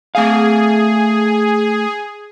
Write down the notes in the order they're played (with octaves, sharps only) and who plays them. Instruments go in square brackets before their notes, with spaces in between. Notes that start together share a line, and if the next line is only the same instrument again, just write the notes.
[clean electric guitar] A3 F5 [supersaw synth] G#4